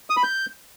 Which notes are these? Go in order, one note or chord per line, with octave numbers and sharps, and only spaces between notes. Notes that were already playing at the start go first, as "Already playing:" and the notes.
D#6
B5
G6